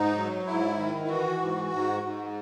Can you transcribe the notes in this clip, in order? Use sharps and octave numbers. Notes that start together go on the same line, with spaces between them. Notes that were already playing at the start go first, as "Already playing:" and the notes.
Already playing: G#2 D#4
F#3
G#2 E4
D#3
E4
E3 F#4
G#2
G#2
G#2